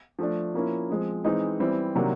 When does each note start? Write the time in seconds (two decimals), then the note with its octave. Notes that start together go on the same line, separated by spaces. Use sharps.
0.19 F3 A3 D4
0.54 F3 A#3 C#4 E4
0.90 F3 G#3 C4
1.24 E3 G#3 C4 D#4
1.60 E3 G3 C4 E4
1.95 C3 D#3 F#3 A#3 D4